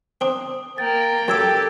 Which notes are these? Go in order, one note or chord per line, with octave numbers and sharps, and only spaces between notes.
C4 D4 D#6
A#3 G5 A6
F#2 G4 A4 A5 D6 E6 G#6 A6